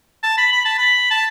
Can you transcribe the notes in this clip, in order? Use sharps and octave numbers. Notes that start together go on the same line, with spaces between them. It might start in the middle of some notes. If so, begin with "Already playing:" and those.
A5
B5
B5
A5
B5
A5